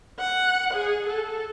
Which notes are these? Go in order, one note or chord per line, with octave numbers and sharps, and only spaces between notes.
F#5
G#4
A4